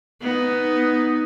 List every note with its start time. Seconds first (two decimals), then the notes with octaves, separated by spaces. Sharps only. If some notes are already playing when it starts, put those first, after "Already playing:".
0.21 B3 D#4